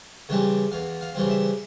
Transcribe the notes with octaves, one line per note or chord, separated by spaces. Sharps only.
C#3 E3 G3 C4
E2 F5
F5
C#3 E3 G3 C4
E5